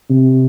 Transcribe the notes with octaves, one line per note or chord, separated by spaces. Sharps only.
C3